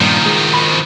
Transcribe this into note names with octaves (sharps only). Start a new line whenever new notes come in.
G2 A#2 D#3 F3
G#3
B5